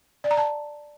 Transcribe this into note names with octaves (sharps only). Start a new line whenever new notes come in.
D5
A#5
A5